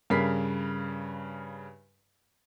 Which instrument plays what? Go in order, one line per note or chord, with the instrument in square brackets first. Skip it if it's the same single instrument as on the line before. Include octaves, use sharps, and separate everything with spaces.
[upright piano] G2 C#3 A#4 B5 B6 C7